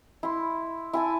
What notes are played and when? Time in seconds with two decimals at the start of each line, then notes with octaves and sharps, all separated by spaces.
0.23 E4 C6
0.93 E4 G#5 A5